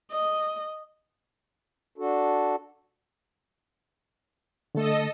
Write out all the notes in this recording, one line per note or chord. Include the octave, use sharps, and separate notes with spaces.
D#5
D4 F#4 A4
D3 A3 A4 D#5